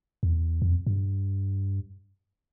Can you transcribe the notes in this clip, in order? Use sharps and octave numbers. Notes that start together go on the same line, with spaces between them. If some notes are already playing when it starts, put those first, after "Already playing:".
E2
F2
G2